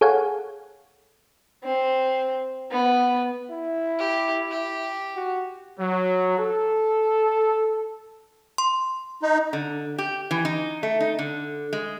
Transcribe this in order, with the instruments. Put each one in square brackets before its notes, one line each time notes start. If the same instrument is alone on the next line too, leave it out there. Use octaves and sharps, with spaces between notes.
[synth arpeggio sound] G#4 A4 C#5 F5 F#5 G#5
[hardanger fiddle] C4
B3
[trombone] E4
[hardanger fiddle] G4
G4
[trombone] F#4
[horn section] F#3
A4
[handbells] C6
[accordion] D#4
[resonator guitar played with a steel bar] D3
G4
E3
D#4
A3
D#4
D3
G#3